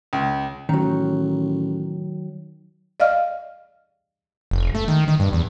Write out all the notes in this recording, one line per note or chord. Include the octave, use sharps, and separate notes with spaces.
C#2
A1 D#3 F#3
D5 D#5 F5 F6
F1
A3
D#3
D#3
G2
E2